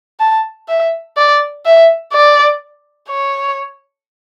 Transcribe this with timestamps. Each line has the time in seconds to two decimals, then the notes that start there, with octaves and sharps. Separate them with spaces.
0.20 A5
0.69 E5
1.17 D5
1.66 E5
2.13 D5
3.09 C#5